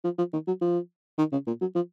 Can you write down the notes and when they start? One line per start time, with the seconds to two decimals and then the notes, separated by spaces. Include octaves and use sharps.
0.04 F3
0.18 F3
0.33 D#3
0.47 F#3
0.61 F3
1.18 D#3
1.32 C#3
1.47 A#2
1.61 F#3
1.75 F3